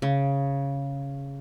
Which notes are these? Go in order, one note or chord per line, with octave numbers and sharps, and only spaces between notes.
C#3